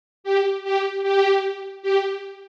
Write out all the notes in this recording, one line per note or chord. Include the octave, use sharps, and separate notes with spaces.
G4
G4
G4
G4